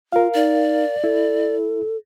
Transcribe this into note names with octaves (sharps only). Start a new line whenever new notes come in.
F4 A#4 F5
D#4 D5
E4 A4